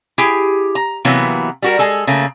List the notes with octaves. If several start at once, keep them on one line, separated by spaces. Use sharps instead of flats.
E4 G4 G#4
A#5
C3 E3 F#3 A#3 B3
G3 F#4 A#4
G#3 G#4 A4
C#3 A3 A#3